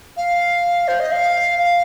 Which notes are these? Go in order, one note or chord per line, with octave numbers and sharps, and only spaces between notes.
F5
C5
D#5
F5
F5